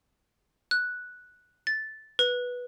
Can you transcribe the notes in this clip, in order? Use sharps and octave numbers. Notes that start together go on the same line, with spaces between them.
F#6
A6
B4